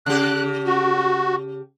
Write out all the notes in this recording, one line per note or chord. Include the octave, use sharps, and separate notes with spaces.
C#3 G4 F#6
F#4